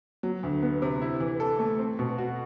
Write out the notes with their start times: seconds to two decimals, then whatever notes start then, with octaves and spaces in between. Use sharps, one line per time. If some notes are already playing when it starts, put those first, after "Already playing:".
0.23 F#3
0.43 D2
0.62 B3
0.82 C3
1.01 E4
1.20 E3
1.40 A4
1.59 A3
1.79 C4
1.99 B2
2.18 F#4